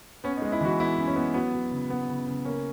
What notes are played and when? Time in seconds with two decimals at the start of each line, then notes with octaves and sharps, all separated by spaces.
0.24 B3 C#4
0.37 D#4
0.42 G#3
0.52 E4
0.61 E3 F#4
0.80 B3 E4
0.97 F#2
1.07 C#4
1.16 B3
1.34 F#3 B3
1.53 F#3
1.71 C#3
1.90 B3
2.08 C#3
2.26 C#3
2.45 A#3 C#4